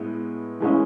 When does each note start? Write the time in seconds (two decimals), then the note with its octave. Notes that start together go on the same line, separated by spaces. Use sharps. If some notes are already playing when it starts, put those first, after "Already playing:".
Already playing: A2 G#3 B3 E4
0.60 E3 G#3 C#4 E4